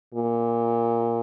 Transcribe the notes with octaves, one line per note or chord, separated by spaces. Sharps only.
A#2